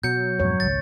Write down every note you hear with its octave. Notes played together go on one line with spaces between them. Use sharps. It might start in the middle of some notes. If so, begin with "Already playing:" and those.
B2 F#3 G6 C#7
F2 G#2 B2 C#5
G#1 C#2 A6